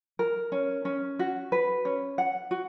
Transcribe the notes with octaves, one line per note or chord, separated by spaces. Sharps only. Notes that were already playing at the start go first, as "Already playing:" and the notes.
A#4
C#4
C#4
F#4
B4
C#4
F#5
F#4